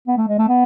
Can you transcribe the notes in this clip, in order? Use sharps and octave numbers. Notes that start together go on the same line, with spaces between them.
B3
A3
G#3
A3
B3